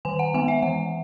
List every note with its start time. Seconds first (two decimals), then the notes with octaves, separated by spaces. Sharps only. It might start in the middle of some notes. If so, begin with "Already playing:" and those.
0.05 D#3 G#5
0.19 F#5
0.34 G#3 B3 G#5
0.48 E5
0.62 E3 F#5